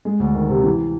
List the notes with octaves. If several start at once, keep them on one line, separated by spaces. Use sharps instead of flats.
G#3
D2
D#3
C3
E3